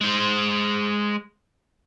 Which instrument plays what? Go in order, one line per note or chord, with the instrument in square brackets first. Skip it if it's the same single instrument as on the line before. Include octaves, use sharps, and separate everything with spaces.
[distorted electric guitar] G#3 C5